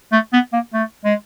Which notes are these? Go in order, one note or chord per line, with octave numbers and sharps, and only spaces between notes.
A3
B3
A#3
A3
G#3